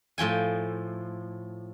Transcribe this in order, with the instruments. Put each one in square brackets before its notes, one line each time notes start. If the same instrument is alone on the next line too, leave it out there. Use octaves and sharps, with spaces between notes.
[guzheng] A2 F3 G5 G#5